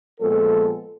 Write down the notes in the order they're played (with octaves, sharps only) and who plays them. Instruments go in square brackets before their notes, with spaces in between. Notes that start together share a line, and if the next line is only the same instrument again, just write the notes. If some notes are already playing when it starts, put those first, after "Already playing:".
[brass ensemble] A#2 F3 G#3 B3 A4